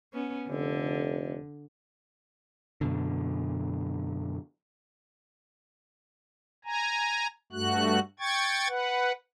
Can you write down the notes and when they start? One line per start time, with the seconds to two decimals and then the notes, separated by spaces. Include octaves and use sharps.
0.13 B3 C#4
0.49 F1 D3
2.81 F#2 B2 D3
6.65 G#5 A#5
7.52 G2 A3 F#4 F#6
8.20 G5 C#6 G#6 A6
8.68 B4 F#5